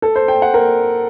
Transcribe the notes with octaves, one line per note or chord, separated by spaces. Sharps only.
A4
C5
G5
F#5
A#4